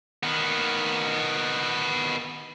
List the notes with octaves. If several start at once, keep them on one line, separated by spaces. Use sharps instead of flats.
D#3 B3